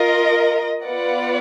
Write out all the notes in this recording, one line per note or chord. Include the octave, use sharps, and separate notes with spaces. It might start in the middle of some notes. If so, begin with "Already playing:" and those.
Already playing: F4 A#4 D#5
B3 F4 B4 D5 F#5